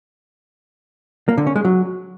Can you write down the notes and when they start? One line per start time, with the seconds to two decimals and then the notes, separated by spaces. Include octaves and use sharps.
1.29 A#3
1.38 D3
1.47 C#4
1.56 G#3
1.65 F#3